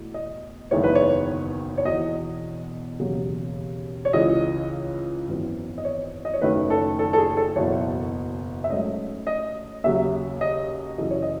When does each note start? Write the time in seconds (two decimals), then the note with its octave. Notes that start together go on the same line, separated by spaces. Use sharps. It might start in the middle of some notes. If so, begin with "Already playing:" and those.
Already playing: E2 B2 A3
0.14 D#5
0.71 F#1 E2 D#3 G#3 B3 C#5
0.84 B4
0.95 C#5
1.77 C#5
1.85 E1 E2 B2 D#5
2.99 E1 D#2 C#3 F#3
4.05 C#5
4.13 C#2 C#3 E3 D#5
5.27 G#1 F#2 E3 B3
5.78 D#5
5.85 C#5
6.25 D#5
6.34 C#5
6.41 F#1 F#2 D#3 A3 C#4 B4
6.70 A4
6.99 A4
7.13 A4
7.18 G#4
7.37 A4
7.56 F#1 E2 B2 C#5
8.64 E5
8.70 G#2 F#3 A3 C#4 D#5
9.27 D#5
9.84 D#2 C#3 F#3 E5
10.41 D#5
10.98 F#2 C#3 E3 D#5
11.10 C#5
11.22 D#5